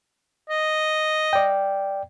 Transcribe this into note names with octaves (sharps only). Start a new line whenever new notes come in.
D#5
D5 G5